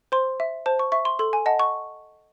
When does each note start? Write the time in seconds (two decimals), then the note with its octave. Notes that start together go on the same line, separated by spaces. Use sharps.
0.12 C5 C6
0.40 E5
0.66 C5 A5
0.79 C#6
0.92 E5 C#6
1.05 C6
1.19 A4 C6
1.33 G#5
1.46 D#5 F#5 A5
1.59 C#6